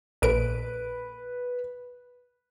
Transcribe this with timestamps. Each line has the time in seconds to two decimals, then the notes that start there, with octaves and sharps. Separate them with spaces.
0.22 A#1 B4 D7